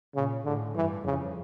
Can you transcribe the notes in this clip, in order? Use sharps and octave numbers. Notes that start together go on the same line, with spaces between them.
A#2 C#3
A2 D3
G2 E3
F2 C#3